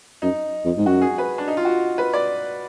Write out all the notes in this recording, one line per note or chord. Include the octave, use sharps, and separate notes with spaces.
F#2 D#4
F2
G#2
F#2 F#4
G#4
B4
D4
D#4
F4
F#4
B4
D5